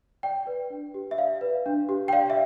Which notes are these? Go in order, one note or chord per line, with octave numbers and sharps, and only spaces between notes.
D5 G5
B4
D4
G4
E5
D5 F5
B4
D4
G4
G5
D5 F5
E5